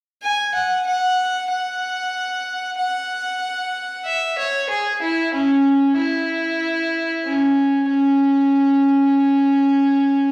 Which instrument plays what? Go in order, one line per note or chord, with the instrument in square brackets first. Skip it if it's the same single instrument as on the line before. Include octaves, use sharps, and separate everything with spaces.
[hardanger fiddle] G#5
F#5
F#5
F#5
F#5
E5
C#5
G#4
E4
C#4
E4
C#4
C#4